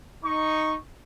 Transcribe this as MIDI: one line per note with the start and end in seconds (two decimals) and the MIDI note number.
0.25 0.77 63
0.25 0.77 85